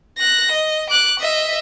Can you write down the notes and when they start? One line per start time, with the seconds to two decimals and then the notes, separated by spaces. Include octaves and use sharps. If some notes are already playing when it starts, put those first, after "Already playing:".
0.18 F#6 A#6
0.51 D#5
0.90 D6 F#6
1.19 D#5 E5